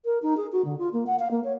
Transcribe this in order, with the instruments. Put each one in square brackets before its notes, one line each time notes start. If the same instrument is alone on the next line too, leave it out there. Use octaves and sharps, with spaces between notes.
[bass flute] A#4
D#4
G#4
F#4
D3
F4
A#3
F#5
F5
A#3
C#5